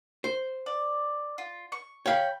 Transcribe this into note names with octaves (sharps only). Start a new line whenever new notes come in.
C5
D5
F4
C#6
C#5 F5 G5 B5